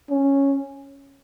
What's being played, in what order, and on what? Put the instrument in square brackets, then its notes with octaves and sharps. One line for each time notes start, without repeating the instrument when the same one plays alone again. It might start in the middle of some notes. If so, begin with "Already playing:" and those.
[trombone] C#4